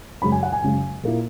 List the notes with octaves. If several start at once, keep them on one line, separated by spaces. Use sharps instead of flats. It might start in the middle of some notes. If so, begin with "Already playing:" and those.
F#2 C#3 G#3 B5
G#5
F#5
G#5
F#2 C#3 G#3
A#2 A#3 E4